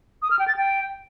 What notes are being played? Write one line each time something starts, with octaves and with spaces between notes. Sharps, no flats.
D#6
F6
G5
A6
G5